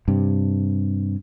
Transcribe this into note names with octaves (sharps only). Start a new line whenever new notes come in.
G2 C3